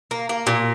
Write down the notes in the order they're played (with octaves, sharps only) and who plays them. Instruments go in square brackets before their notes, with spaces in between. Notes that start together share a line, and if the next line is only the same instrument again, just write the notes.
[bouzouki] A#3
A#3
A#2